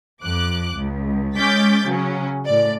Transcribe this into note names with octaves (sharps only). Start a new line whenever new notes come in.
F2 D6 F#6
C#2
G#3 C#4 D6 G6 A6 B6
C#3 F#3 C#4
A2 D5